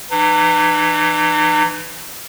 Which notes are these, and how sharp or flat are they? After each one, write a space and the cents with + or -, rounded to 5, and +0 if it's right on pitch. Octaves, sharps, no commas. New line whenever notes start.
E3 +10 D#4 -40